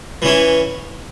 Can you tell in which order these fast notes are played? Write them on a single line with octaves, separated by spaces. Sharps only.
E3 C#4 E4